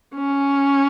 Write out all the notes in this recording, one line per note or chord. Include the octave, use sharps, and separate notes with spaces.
C#4